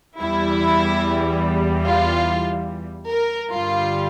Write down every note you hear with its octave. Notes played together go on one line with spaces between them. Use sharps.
E2 E3 G3 E4
F4
A#4
G2 D3 G3 F4